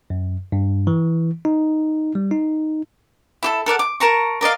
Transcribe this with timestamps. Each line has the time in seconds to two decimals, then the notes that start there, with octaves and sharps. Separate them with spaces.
0.10 F#2
0.52 G2
0.87 E3
1.45 D#4
2.15 G3
2.31 D#4
3.43 E4 G4 A4
3.66 A4 A#4 D5 F#5
3.79 D6
4.00 A#4 A5 A#5 C#6
4.41 A#4 D5 D#5 F5